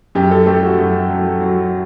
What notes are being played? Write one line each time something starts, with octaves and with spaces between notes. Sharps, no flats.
F#2 G4
A4
A3 G4
F#4
F#2
F#3
F#3